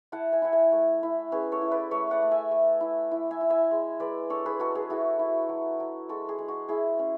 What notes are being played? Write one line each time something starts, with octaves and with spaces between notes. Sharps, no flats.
E4 F#5 A5
E5 G#5
E4 F#5
E5 G#5
A3
E4
C#4 G#4 B4
A4 C#5
E4
B4 D5
A3 C#5 E5
D5 F#5
A3
E5 G#5
A3
E4
E4
E5 G#5
E4
E5 G#5
G#3
G#3 B4 D5
D4 A4 C#5
G#4 B4
G#3 F#4 A4
G#4 B4
E4 F#4 A4
E4
F#3
F#3
G#3 F#4 A4
G#4
G#3
F#4
E4 G#4
C#4